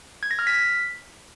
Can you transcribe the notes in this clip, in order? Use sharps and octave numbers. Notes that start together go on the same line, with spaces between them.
G#6
A#6
F6
B6